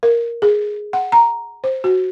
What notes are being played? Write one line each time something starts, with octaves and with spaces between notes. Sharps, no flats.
A#4
G#4
F#5
A#5
C5
F#4